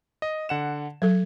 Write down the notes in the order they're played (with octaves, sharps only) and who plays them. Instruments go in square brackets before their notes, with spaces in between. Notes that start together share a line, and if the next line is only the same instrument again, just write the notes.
[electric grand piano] D#5
D3 F#5 E7
[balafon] F#3 A4 [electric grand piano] G#6